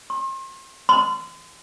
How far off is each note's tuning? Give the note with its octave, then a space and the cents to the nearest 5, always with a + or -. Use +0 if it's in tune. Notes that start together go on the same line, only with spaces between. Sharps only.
C6 +40
C6 -30